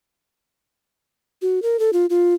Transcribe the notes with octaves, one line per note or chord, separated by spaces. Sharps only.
F#4
A#4
A4
F4
F4